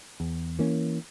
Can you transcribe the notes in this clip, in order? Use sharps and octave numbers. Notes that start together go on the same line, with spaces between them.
E2
E3 A#3 C#4